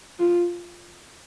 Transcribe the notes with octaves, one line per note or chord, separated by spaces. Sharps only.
F4